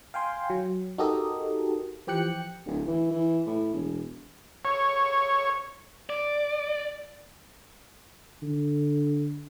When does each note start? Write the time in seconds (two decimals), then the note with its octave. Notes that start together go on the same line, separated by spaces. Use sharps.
0.14 F5 G5 G#5 C6
0.50 F#3
0.98 D#4 F#4 G4 A4 A#4 D#5
2.07 E3 F3 G4 G5 F#6 C#7
2.66 D1
2.87 E3
3.11 E3
3.46 A2
3.74 E1
4.65 C#5
6.10 D5
8.42 D3